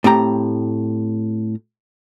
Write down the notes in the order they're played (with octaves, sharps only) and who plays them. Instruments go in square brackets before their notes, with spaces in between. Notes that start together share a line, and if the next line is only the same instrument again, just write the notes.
[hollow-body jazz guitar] A2 C4 G4 A#5